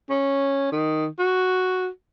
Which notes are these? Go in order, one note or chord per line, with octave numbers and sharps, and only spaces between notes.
C#4
D#3
F#4